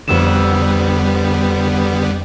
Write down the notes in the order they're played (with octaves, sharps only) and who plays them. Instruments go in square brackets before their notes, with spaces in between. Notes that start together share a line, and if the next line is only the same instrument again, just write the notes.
[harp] F2 E6 E7 [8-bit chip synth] D3 G3 B3